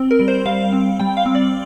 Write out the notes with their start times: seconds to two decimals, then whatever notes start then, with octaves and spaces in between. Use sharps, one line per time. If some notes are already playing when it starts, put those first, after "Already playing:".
Already playing: C4
0.11 A#4
0.20 G3
0.28 C5
0.46 G3 F5
0.72 C4
0.99 G3 G5
1.17 F5
1.26 C4
1.35 D5